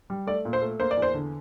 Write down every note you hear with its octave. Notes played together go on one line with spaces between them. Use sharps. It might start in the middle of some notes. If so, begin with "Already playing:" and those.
G3
A3 D5
A#2
C5
A3
A#3 C5
D5
E2
C5
D3